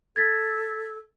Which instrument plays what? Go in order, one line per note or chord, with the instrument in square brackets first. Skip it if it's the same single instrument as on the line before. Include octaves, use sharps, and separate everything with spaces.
[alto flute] A4 [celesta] G#6 A6 B6